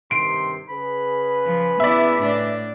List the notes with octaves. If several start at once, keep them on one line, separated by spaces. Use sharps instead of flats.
G2 C3 D#3 C6 D7
C#3 G#4 B4 B5
F3
B3 E4 D5 E5
A2 D4